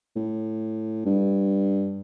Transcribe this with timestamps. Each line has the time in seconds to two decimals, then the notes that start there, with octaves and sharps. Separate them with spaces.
0.16 A2
1.06 G2